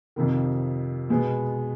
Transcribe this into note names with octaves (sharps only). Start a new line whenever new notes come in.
F2 C3 D#3
B2 G#3 B3